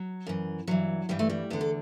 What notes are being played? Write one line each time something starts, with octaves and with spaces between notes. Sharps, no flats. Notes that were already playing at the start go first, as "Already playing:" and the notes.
Already playing: F#3
F#2 E3
G2 E3 F#3
G2 E3 G3
A3
G3
E2 D3 B3
A4